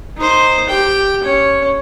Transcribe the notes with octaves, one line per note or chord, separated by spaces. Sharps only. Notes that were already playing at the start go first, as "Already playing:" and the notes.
D#4 C5
G4 G5
C#4 C#5